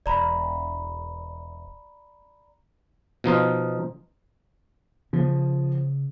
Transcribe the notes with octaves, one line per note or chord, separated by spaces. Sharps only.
E1 D5 A#5 B5
B2 F3 D#4 F4
C#3 F3